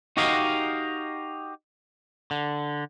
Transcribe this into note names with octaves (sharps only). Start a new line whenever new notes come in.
D#4 F#4 G4 A#4 D#5 F5
D3